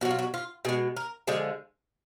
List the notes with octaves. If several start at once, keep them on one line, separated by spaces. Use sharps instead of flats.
B2 F#3 F#4
F4
F#4
F4
B2 G#3 G#4
A#4
D3 F3 G#3 G#4